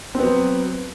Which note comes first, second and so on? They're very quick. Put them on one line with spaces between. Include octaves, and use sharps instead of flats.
C4 B3 F#3